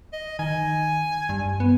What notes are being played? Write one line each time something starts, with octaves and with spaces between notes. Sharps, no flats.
D#5
D#3 G#5
G2
B3